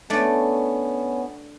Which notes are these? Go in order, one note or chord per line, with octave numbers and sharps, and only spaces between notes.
A3 B3 C#4 D4 D5